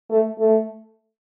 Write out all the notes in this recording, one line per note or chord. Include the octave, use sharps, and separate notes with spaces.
A3
A3